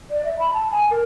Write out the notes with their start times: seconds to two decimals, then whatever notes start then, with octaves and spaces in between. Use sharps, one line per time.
0.11 D5
0.25 E5
0.39 B5
0.54 A5
0.72 G#5
0.91 A#4